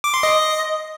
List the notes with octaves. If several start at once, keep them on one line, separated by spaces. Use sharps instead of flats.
D6
C6
D#5